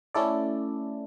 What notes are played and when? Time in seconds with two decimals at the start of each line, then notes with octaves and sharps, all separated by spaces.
0.14 A3 C#4 E4 A4 D5